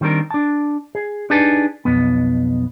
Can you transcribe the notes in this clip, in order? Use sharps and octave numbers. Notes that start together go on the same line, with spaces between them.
D#3 G3 C4 D4 A#4
D4 A5
G#4
D4 D#4 G4 G#4 B4 A5
B1 F2 B3